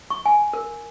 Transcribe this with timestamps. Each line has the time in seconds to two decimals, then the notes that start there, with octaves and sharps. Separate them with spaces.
0.10 C#6
0.26 G#5
0.53 A#4